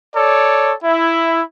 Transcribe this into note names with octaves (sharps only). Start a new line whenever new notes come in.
A4 C#5 D5
E4